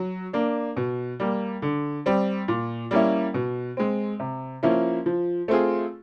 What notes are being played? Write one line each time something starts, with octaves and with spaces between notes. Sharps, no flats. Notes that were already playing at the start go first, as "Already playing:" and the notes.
Already playing: F#3
A#3 D4
B2
G3 A#3
D3
G3 C4
A#2
G3 A#3 C#4 E4
B2
G#3 C4
C3
F3 A#3 C#4 E4
F3
A3 C4 F4 G#4